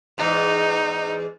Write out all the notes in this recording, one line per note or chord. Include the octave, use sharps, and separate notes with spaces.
E2 G#2 D#4